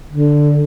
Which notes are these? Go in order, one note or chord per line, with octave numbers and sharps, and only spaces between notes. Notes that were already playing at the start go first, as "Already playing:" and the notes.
D3